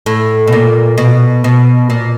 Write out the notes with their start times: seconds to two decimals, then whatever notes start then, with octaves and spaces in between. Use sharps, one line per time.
0.06 A2
0.47 B2
0.52 A#2
0.98 B2
1.44 B2
1.90 A#2